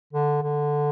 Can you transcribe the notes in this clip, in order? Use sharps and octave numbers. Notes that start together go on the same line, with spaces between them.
D3
D3